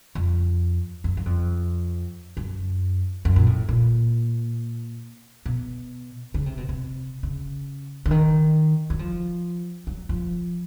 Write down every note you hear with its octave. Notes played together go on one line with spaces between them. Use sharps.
F2
F#2
F#2
F2
F#2
F#2
A#2
A2
A#2
B2
C#3
C3
B2
C3
C#3
D3
D#3
F#3
F3
F#3
F3